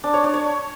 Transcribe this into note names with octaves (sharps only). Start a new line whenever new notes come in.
D4
C#5
D4
C#5